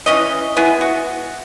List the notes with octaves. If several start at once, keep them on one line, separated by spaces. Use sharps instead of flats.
E3 C#4 D#5
B3 E4 G#4
F#4